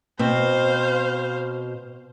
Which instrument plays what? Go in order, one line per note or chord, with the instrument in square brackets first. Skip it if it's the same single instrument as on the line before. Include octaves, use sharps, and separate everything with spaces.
[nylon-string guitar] B2 C4 [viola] C5 F5